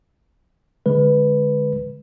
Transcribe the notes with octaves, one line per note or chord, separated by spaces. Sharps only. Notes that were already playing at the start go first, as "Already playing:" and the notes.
D3 G#3 B4